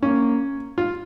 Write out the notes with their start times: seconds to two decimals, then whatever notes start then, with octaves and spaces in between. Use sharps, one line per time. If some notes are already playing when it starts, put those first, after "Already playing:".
0.03 A#3 C#4
0.78 F4